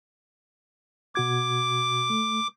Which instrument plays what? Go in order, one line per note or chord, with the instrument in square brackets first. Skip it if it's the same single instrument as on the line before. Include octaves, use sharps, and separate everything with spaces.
[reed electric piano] B2 F#4 G#6 [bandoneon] D6
[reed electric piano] A3